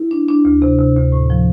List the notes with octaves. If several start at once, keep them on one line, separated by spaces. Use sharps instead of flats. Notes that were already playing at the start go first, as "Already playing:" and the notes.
Already playing: E4
D4
D4
D2
C3
C3
D2
A2
F3